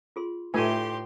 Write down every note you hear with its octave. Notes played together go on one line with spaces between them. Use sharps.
F4 G#4 C6
A2 A3 D#4 F4 G4 B4 G#5 C6